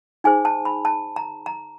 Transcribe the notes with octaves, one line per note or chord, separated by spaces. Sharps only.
D#4 G#4 C5 G#5
A5
B5
A5
A#5
A#5